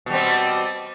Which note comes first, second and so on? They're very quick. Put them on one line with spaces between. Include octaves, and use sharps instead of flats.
B2 G3 C4